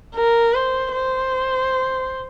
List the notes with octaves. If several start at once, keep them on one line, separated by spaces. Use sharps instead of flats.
A#4
C5
C5